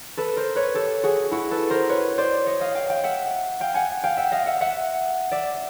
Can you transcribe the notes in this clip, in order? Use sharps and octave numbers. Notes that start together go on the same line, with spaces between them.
A4 B4
A#4 C5
B4 C#5
G4 A4
F#4 G#4
E4 F#4
A4 B4
A#4 C5
B4 C#5
C5 D5
C#5 D#5
D#5 F5
F5 G5
F5 G5
E5 F#5
F5 G5
F#5 G#5
F5 G5
E5 F#5
D#5 F5
E5 F#5
E5 F#5
D5 E5